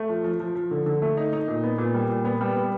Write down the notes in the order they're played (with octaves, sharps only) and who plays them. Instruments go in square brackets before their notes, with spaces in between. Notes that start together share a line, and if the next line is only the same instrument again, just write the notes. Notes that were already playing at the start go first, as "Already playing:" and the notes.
Already playing: [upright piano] A3
F3
F3
F3
F3
D3
D3
A3
D#4
D#4
A#2
B3
A#2
G3
A#2
B3
G3
B3